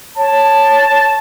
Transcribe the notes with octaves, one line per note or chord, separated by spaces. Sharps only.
C#5 A5